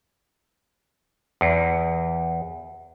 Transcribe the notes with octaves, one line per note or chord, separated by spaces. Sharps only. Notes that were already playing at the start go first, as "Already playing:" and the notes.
E2